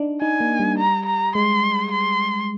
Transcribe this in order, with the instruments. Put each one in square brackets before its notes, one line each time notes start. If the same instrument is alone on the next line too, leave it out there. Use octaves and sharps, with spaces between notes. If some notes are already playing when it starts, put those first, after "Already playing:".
Already playing: [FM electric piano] D4 D#4
[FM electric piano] D#4 [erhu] G#5
[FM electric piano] A#3
G3
[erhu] A#5
A#5
[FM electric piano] G#3 [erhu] C6
[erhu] C6